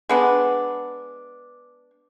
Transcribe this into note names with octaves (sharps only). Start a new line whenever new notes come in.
G#3 B3 D4